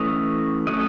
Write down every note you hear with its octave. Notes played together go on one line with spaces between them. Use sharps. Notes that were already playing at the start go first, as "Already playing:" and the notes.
Already playing: E3 A3 C#4 D#5
F#3 A3 C#4 D#5